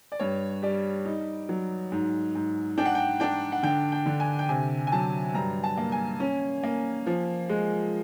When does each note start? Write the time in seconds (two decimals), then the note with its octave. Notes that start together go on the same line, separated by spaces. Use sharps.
0.12 D5
0.20 G2 C#5
0.62 G3 D5
1.05 D#4
1.49 F#3
1.92 G#2
2.35 G#2
2.78 D4 G5
2.86 F#5
2.95 G5
3.20 D4 G5
3.52 F#5
3.63 D3 G5
3.92 G5
4.06 D3
4.20 G#5
4.39 G5
4.49 C3 G#5
4.87 G#5
4.92 F#3 A5
5.34 G2 A#5
5.64 A5
5.77 A#3
5.92 G#5
6.20 C#4
6.63 A#3
7.06 F3
7.49 G#3